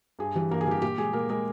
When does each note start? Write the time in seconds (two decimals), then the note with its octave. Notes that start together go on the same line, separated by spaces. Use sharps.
0.19 G2 G#4
0.35 E3 G3
0.51 G2 A#3 A#4
0.61 G#4
0.67 E3 G3 G4
0.82 A#2 G4
0.98 G#3 G#4
1.13 A#2 A#3 A#4
1.29 G#3 A#3 A#4